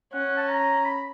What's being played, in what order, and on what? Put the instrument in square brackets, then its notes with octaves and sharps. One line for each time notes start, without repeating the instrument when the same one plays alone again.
[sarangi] C#4 [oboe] F#5
[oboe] A5
A#5
B5